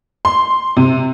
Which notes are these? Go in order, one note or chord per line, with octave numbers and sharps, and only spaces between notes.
C6
C3